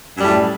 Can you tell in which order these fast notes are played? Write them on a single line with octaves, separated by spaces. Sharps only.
F#2 G3 A2